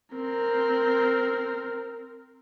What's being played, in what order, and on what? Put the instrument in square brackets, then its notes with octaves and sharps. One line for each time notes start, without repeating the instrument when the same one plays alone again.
[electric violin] C4 A#4